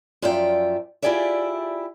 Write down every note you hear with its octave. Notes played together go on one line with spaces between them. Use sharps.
F#2 F3 F4 D5 E5 G5
E4 F4 G4 G#4 D5 E5